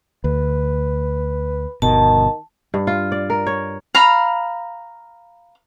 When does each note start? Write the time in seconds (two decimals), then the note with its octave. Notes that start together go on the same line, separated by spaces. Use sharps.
0.24 D2 B4
1.82 G1 B2 D#3 A5
2.74 G2
2.87 F4
3.12 D5
3.30 A#4
3.47 C#5
3.95 F5 A#5 B5